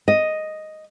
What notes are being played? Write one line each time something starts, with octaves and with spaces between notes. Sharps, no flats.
D#5